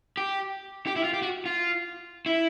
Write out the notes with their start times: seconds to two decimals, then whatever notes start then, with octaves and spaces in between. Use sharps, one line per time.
0.17 G4
0.87 G4
0.96 E4
1.04 F4
1.14 G4
1.22 F#4
1.46 F4
2.26 E4